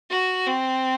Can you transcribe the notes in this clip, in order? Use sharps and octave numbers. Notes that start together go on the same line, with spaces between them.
F#4
C4